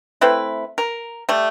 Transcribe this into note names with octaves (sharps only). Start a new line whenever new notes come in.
A3 C4 E4 B4
A#4
G3 A3